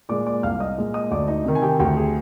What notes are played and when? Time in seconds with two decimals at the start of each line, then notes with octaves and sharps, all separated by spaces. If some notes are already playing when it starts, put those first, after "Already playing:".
0.09 A#2 G#3 D5 D6
0.26 D5 D6
0.43 C2 F5 F6
0.60 D#5 D#6
0.77 A#2 G#3
0.94 D#5 D#6
1.11 D2 D5 D6
1.28 D#4 D#5
1.45 C3 D#3
1.55 G#5
1.62 G4 G5
1.79 D2 G4 G5
1.97 G#4